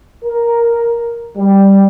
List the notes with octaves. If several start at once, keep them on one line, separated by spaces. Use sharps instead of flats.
A#4
G3